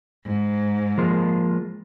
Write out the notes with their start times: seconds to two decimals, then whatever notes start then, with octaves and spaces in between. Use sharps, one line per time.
0.25 G#2
0.98 F3 G#3 A#3